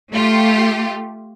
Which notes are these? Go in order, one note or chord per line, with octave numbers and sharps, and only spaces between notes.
A3 F4 G4